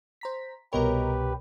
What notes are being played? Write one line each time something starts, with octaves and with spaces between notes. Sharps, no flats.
C5 A#5 B6
C2 B2 G4 A#4 B4 C#5 D#5 A#5